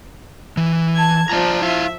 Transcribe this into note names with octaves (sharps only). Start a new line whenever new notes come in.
E3
A5 G#6
F3 D5 A5 A#5
E4 E5 F5